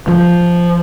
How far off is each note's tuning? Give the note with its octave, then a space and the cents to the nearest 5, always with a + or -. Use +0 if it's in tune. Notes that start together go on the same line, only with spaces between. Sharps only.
F3 -5